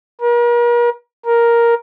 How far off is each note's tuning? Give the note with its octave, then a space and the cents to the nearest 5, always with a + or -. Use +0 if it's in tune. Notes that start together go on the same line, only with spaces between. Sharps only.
A#4 +40
A#4 +5